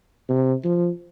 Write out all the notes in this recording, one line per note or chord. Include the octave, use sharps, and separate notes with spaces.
C3
F3